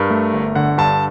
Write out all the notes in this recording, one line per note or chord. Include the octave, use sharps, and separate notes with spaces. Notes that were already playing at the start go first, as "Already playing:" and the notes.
Already playing: G2 A#4
A3
G1
D3 F#5
G2 A5